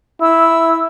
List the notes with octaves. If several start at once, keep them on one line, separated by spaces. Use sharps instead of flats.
E4 E6